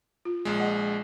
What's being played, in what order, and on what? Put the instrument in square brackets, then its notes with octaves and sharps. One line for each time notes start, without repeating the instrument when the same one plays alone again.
[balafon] F4
[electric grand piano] A#1 G#3
[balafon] D#5 F#5